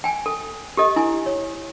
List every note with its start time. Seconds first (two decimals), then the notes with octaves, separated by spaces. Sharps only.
0.04 G5 G#5
0.26 A4
0.77 G4 A4 D#5
0.96 E4 G#5
1.26 C#5